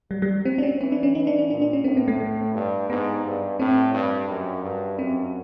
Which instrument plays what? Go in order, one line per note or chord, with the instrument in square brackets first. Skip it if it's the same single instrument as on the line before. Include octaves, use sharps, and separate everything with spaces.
[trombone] F#3 [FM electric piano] G3
[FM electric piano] G3
C4
D4
C#4
[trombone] E3 [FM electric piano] C4
[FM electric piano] D4
C#4
[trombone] E3 [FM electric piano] D#4
[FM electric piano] D4
D4
[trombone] A#2 [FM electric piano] D4
[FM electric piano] D4
C#4
[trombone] A2 [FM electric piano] C4
[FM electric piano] B3
A3
A3
[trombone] G2
[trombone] G#2 [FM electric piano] B3
[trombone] G2
[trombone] A2 [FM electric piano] C4
[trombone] G2
F#2
G2
[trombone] F#2 [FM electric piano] C4